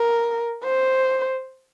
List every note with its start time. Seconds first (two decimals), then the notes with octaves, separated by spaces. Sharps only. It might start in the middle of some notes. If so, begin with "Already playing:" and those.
Already playing: A#4
0.64 C5